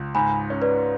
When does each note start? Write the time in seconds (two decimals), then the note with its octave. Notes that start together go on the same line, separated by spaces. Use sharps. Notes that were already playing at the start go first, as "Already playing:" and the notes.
Already playing: C#2
0.15 G#2 G#5 B5
0.50 C#4
0.62 B4 D5